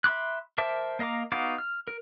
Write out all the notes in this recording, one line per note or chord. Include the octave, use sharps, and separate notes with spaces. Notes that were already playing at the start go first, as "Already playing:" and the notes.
E5 B5 C6 D6 F#6
A#4 C5 E5 A5 D6
A#3 D#5 F5 A#5 D6
B3 D#4 F#4 F5 D6
F6
A#4